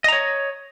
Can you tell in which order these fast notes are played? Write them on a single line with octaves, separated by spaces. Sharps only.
D#5 A#5 C#5